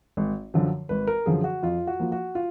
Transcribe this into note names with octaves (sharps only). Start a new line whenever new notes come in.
G#1
F#2 D3 F3
G#1 B4
A#4
F#2 D3 F3 G#4
F#4
F2 F4
F#4
F3 A#3 F4
F#4
F4